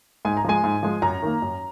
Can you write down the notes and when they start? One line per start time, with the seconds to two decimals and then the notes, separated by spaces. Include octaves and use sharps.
0.25 G#2 G#5
0.37 A#5
0.44 F3 G#3 G#5
0.64 G#2
0.83 F3 G#3
1.02 F#2 A#5
1.22 D#3 A#3
1.42 F#2